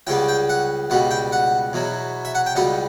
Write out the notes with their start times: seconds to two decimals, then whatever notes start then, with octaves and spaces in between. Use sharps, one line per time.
0.07 C#2 C#3 G3 B3 G5
0.28 G5
0.49 F#5
0.90 C#2 B2 G3 F#5
1.11 G5
1.32 F#5
1.73 E2 B2 F#3
2.25 E5
2.35 F#5
2.46 G5
2.55 C#2 B2 G3 F#5